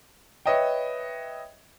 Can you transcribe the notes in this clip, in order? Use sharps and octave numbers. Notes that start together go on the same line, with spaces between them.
B4 C#5 D#5 E5 G5